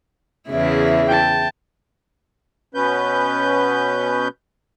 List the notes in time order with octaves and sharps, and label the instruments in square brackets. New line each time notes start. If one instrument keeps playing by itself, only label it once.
[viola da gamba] E2 C#3 E4
[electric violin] G5 A5
[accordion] B2 B3 C#4 B4 G6